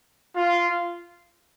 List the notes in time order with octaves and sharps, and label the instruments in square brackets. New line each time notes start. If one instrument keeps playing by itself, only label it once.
[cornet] F4